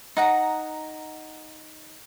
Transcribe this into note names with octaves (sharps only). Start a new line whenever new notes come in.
D#4 F#5 A#5